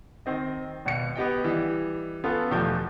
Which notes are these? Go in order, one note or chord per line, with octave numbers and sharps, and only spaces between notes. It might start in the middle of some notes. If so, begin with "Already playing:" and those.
D#3 C4 D#5
G#1 B2 F5 C#7
B3 G4 D#5 G5
E3 G3
B3 C#4 F4 A4
E2 B2 F3 A3 G4 G6